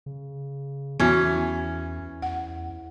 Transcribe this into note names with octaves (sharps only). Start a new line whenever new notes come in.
C#3
E2 E3 B3 C#4 F#4
E2 F#5